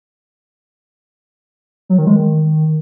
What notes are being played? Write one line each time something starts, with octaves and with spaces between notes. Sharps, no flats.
F#3
D#3
G#3
D#3